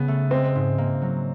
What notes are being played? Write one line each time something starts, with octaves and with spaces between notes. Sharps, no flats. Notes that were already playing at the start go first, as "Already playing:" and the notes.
Already playing: C#3 B3
A3
G#3 C4
G#2
A#3
F#3